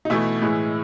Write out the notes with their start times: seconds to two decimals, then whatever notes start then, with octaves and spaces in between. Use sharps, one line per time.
0.05 D#4
0.10 B2 E3 A3 E4
0.42 A2 E3 G#3